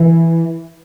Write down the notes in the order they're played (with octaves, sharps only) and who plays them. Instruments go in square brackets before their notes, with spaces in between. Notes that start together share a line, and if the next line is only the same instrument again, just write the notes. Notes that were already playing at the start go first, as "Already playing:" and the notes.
Already playing: [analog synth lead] E3